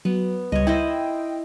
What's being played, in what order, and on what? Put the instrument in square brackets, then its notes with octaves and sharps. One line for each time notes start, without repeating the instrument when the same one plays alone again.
[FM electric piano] F#3 [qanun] B3
[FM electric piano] C#2 G3 [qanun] C#5 D#5
[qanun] E4 C5 D#5 [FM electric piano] G5